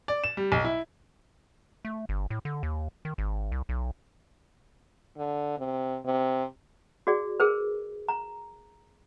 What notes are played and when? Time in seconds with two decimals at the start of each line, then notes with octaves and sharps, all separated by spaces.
0.08 D5
0.24 E7
0.37 G3
0.52 B1
0.65 E4
1.85 A3
2.09 G1
2.30 A2
2.45 D3
2.63 D#2
3.05 D#3
3.18 G#1
3.52 C2
3.69 B1
5.17 D3
5.58 C3
6.05 C3
7.07 F#4 G#4 D5
7.40 G#4 A#4 B4
8.08 A#5